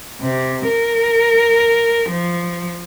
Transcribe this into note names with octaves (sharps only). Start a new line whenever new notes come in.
C3
A#4
F3